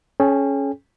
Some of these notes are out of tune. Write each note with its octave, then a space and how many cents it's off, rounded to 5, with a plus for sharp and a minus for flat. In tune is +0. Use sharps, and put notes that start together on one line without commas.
C#4 +0 G#4 +45 G5 +45